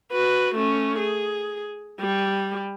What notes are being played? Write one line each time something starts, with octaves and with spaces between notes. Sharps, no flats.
F#4 B4
A3 C#4
G#4
G3